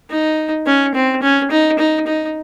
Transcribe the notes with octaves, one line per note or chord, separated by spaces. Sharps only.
D#4
C#4
C4
C#4
D#4
D#4
D#4